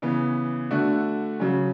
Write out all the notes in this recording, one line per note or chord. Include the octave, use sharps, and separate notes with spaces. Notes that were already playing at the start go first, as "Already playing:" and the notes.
C#3 E3 B3
D3 A3 D4 F#4
C#3 F#3 C#4